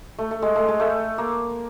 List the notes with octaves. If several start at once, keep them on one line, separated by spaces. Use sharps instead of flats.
A3
A3
G#3
A3
G#3
A3
A#3